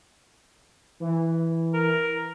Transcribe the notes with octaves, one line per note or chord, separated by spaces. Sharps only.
E3
A#4